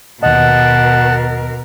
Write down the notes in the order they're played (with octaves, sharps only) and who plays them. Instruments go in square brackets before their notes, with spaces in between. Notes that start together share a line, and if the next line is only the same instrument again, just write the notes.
[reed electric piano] D#2 D#5 [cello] B2 A#4 [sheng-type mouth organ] F#5 A5